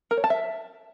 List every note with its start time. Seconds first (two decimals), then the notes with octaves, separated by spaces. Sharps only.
0.11 A#4
0.17 C#5
0.24 A5
0.30 E5